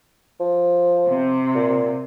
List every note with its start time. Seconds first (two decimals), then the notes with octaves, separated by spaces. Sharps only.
0.40 F3
1.07 C3
1.55 A#2